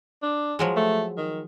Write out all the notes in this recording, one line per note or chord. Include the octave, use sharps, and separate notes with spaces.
D4
F3 F#3 G#3
A3
D#3